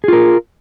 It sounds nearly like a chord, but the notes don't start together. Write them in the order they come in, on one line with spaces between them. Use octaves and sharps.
G#4 F4 A#4